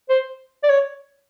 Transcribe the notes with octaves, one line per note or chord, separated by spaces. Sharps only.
C5
D5
C#5